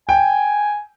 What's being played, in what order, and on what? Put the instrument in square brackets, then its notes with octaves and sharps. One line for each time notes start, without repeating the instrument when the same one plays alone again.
[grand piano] G5 [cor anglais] G#5